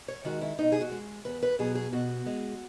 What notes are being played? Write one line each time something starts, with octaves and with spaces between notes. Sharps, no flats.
C#5
D#3 G#3 F#4
E4
B2 D#4
G#4
F#4
G#3
E2 B4
B4
B2 F#3 G#4
G#4
B2 F#4
G#3